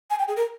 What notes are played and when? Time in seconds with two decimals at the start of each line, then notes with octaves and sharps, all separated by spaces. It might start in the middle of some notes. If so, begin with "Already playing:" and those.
0.10 G#5
0.19 G5
0.28 G#4
0.36 A#4